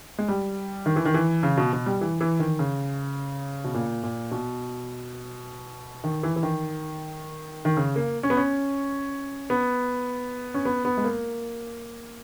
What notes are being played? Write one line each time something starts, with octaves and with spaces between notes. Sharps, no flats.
G#3
G3
D#3
E3
D#3
E3
C#3
B2
B2
G3
E3
E3
D#3
C#3
B2
A#2
A#2
B2
D#3
E3
E3
D#3
D#3
C#3
A#3
C#4
B3
C#4
B3
C#4
B3
B3
G#3
A#3